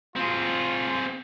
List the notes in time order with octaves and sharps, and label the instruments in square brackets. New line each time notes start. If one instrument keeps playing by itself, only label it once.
[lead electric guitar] C4 G#4 [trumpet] F4